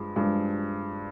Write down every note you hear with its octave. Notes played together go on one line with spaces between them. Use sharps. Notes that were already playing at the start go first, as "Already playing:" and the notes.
Already playing: G2 F3 G#3
G2 F3 G#3